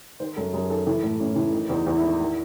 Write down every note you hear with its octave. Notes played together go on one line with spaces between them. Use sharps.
D#3 C5
F#2 A4
F#2 G#4
D#3 A4
E3 A4
A2
A2 C#4
E3
D#3 D#4
E2
D#4
E2
E4
D#3
D#3